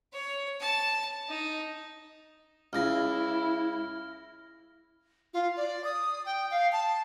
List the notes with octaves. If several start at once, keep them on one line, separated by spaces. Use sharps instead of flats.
C#5
A5
D#4
C#2 C#3 E4 F6 A#6
F4
D5
D#6
G5
F5
A5